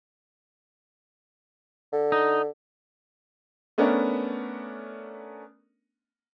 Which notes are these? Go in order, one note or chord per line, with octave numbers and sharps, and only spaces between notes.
D3
D#4
A3 B3 C#4 D4 A#4